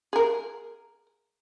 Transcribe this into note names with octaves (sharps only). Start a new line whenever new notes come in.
G#4 A#4